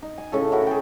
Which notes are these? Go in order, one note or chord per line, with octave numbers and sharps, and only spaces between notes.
D#4
G#5
A2 C#3 A3 A4
E4 F#4 G#4 A#4
G#4 A4 G5